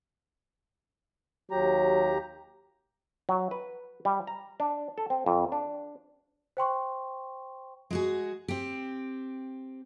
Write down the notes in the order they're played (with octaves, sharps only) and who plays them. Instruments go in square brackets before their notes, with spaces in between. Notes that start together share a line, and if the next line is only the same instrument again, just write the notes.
[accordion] D#2 G4 A#5 [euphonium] F#3
[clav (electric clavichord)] F#3
B4
G3
A#5
D4
A4
C4
F2
D4
[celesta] C5 G5 C6 C#6
[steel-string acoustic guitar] G#3 F#4 G#4
C4 G4